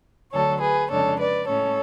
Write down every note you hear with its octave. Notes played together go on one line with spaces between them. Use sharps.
D2 D3 F#3 A4 C#5
G#4 B4
F2 C#3 G#3 D4 A4 C#5
B4 D5
A2 G#3 C#4 A4 C#5